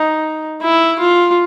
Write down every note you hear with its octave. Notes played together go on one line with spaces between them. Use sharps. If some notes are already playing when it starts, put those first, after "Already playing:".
Already playing: D#4
E4
F4